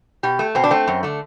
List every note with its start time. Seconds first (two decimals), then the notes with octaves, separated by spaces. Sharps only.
0.23 B2 G4
0.39 A3
0.55 B2 C4
0.64 D4
0.71 A3 C4
0.88 F#2
1.03 D3 A3